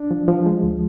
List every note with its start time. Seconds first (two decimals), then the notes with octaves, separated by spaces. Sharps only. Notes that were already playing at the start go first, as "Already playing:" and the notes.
Already playing: D4
0.11 F3
0.28 F3
0.46 G#3
0.63 D2